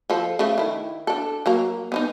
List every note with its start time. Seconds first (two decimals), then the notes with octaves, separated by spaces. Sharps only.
0.10 F3 F4 A4
0.39 C#3 A3
0.58 D#3 E4
1.07 D4 A4
1.46 F#3 A#3 A#5
1.92 B3 C#4 D#4